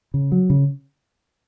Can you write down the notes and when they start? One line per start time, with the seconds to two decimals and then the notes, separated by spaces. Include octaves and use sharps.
0.14 C#3
0.32 F#3
0.50 C#3